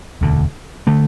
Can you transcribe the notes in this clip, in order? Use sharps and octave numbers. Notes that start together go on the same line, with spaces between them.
E1 D2 D3
D3 A3